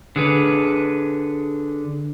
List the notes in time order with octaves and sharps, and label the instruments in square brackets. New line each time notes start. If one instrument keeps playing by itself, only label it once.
[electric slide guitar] D3 G#4 B4